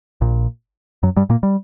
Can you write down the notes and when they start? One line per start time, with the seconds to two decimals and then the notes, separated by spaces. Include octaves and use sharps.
0.21 A#1 A#2
1.03 F#2 F#3
1.16 G2 G3
1.30 A#2 A#3
1.43 G3